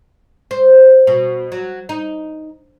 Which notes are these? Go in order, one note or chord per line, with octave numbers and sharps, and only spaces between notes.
C5
B2
F#3
D#4